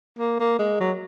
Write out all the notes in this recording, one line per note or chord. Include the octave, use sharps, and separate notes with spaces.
A#3
A#3
G#3
F#3